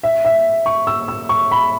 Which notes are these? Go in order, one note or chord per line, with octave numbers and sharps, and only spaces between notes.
E5
E5
C#6
E6
E6
C#6
B5